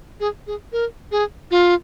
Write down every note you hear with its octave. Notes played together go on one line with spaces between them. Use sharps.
G#4
G#4
A#4
G#4
F4